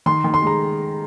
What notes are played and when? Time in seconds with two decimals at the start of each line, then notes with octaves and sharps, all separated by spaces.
0.06 D#3 C6
0.24 D#3
0.34 C6
0.42 G#3 A#5